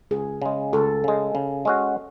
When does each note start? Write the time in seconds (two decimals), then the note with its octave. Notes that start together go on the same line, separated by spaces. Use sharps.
0.11 C#2 G#4
0.42 C#3 G#3
0.73 C#2 A4
1.04 C#3 G#3
1.35 C#3
1.65 G#3 C#4 F#4